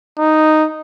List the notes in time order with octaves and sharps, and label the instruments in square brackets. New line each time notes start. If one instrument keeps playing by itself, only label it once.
[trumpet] D#4